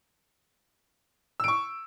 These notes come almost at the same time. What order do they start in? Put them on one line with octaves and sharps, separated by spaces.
E6 D7 C#6